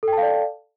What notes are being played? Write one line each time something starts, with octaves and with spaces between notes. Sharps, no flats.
A4 D5 F5 G5 A5